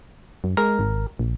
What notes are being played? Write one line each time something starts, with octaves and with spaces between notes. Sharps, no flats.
F#2
G#3 A#4
G#1
A#1